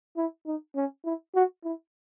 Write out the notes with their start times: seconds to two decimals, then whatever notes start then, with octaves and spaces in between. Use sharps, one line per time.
0.17 E4
0.46 D#4
0.76 C#4
1.05 E4
1.35 F#4
1.64 E4